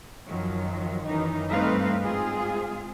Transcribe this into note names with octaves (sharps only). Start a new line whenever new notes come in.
F#2 D#3 F3 F#3
F#2 D#3 E3 D#4
G2 A3 C4 D#4 B4 F5
G#2 C4 F4 G#4 F5